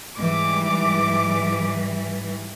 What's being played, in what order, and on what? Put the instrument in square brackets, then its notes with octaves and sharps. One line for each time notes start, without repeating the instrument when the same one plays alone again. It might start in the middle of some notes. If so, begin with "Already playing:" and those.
[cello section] G#2 E3 G3 [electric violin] D6